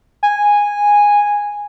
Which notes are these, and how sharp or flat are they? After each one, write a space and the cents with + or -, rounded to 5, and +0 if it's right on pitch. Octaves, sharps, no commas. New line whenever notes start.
G#5 -10